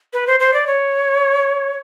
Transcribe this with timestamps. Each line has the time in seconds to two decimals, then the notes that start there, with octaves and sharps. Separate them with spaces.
0.13 B4
0.27 C5
0.40 C5
0.54 D5
0.67 C#5